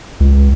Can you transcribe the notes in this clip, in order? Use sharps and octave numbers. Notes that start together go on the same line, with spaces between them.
C#2